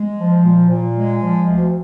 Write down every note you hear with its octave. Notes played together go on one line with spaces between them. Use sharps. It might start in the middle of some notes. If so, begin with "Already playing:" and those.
Already playing: G#3
F3
A#2
A#2
G#3
F3
D2